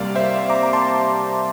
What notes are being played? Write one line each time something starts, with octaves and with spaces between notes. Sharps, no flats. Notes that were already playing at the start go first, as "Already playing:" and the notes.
Already playing: C2 C3 G3 A#3 D5 F5
C5 E5
A#5 D6
A#5
A5 C6